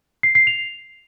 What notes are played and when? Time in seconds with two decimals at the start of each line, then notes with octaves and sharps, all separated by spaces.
0.23 C7
0.35 C7
0.47 F7